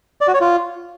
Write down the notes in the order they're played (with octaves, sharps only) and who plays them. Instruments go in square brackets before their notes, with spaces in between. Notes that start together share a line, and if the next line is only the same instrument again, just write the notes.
[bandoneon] D5
F#4
C#5
F4